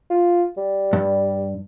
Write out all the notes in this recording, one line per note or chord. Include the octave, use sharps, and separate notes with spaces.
F4
G3
G2